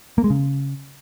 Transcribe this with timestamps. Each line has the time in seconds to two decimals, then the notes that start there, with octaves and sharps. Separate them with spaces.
0.18 A#3
0.24 G#3
0.30 C#3